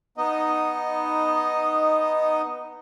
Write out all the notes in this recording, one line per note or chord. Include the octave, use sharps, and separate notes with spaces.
B3 D#4 D#5